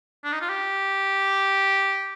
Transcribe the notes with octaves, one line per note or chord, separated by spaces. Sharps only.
D4
D#4
F4
G4